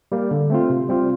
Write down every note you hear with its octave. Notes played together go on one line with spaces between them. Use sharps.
G3 A#3
D3
A3 C4 F4
C3
G3 C4 F4